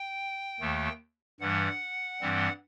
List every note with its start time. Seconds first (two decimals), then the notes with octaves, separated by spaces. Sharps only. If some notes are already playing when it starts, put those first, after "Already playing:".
Already playing: G5
0.60 D#2 D#3 A3
1.40 G2 E3 G3 F#5
2.21 G2 E3 G3 C4